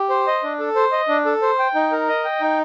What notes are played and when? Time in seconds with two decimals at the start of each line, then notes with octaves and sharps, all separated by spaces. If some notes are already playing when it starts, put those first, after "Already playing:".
Already playing: G4
0.10 C5
0.27 D#5
0.43 D4
0.59 A4
0.76 C5
0.92 D#5
1.08 D4
1.25 A4
1.42 C5
1.59 G5
1.75 D#4
1.92 A#4
2.08 D#5
2.25 G5
2.41 D#4